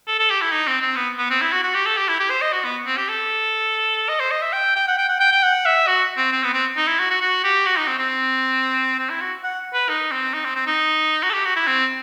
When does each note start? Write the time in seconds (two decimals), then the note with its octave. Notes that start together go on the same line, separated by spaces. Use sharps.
0.07 A4
0.19 A4
0.30 G4
0.41 E4
0.52 D#4
0.67 C4
0.81 C4
0.96 B3
1.18 B3
1.30 C4
1.41 E4
1.52 F#4
1.64 F#4
1.74 G4
1.86 A4
1.97 G4
2.08 E4
2.20 G4
2.30 C5
2.41 D#5
2.52 F#4
2.64 B3
2.86 C4
2.97 G4
3.09 A4
4.09 D#5
4.20 C5
4.31 D#5
4.42 E5
4.53 G5
4.76 G5
4.88 F#5
4.98 G5
5.08 F#5
5.20 G5
5.32 G5
5.43 F#5
5.65 E5
5.87 F#4
6.17 C4
6.32 C4
6.43 B3
6.54 C4
6.77 D#4
6.88 E4
6.99 F#4
7.10 F#4
7.21 F#4
7.44 G4
7.66 F#4
7.77 D#4
7.87 C4
7.99 C4
8.99 C4
9.10 E4
9.21 F#4
9.44 F#5
9.73 B4
9.89 D#4
10.11 C4
10.33 D#4
10.44 C4
10.55 C4
10.66 D#4
11.23 F#4
11.30 A4
11.33 G4
11.45 F#4
11.56 E4
11.67 C4